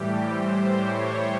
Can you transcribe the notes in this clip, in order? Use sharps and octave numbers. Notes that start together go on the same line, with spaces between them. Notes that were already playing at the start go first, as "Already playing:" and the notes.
Already playing: A2 E3 G3 G4
C5
C#5